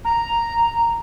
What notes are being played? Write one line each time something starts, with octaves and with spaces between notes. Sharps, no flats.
A#5